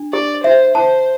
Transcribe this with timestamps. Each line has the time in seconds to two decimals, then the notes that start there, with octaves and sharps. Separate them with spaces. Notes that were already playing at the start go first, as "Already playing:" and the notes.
Already playing: D4
0.13 G4 D5
0.43 C5 E5
0.75 C5 A5